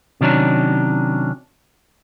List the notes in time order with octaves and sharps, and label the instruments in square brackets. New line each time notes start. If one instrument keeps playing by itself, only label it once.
[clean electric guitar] C3 D#3 F#3 C#4 D4